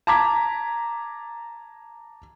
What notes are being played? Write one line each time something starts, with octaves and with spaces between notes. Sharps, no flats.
A5 A#5 D6 G#6 B6